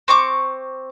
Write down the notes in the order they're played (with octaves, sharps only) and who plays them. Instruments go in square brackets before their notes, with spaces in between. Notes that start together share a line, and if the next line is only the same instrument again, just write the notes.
[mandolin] C4 C#6 D6